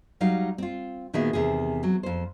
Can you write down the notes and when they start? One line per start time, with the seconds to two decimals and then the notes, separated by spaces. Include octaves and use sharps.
0.21 F#3 G3 D#4 F5
0.58 C4 F4
1.13 A#2 D#3 B3 F#4 G#4 E5
1.33 E2 C3 D#3 G#4
1.83 F#3 C4
2.03 F2 C5